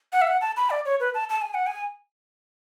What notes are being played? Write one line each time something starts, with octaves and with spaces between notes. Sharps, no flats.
F#5
E5
F#5
A5
B5
D5
C#5
B4
A5
A5
G#5
F#5
G#5